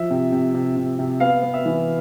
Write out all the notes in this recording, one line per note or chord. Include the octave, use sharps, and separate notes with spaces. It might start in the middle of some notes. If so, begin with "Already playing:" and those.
Already playing: F3 E5
C3
C3
C3
C3
C3
B3 F5
B3
E5
E3